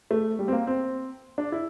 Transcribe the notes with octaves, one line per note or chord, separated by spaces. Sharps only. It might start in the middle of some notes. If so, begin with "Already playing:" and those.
A3
G3
C4
A#3
C4
D4
E4